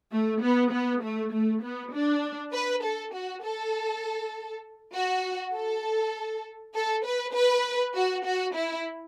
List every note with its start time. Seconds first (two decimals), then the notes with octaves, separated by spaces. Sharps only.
0.12 A3
0.42 B3
0.72 B3
1.02 A3
1.32 A3
1.62 B3
1.93 D4
2.53 B4
2.82 A4
3.13 F#4
3.43 A4
4.94 F#4
5.54 A4
6.74 A4
7.05 B4
7.35 B4
7.95 F#4
8.25 F#4
8.55 E4